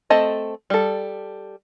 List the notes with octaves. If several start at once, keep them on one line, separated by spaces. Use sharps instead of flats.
A3 C4 A4 D#5
G3 A4